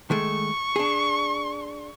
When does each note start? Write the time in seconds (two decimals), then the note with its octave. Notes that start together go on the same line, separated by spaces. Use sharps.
0.10 D#3 G#3 A3 C#6
0.76 D4 G#4